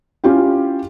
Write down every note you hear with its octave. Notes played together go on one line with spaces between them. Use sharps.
C#4 E4 F4 G4 G5